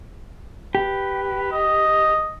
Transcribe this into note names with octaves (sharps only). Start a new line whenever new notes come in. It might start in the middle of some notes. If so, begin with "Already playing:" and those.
G4 B4
D#5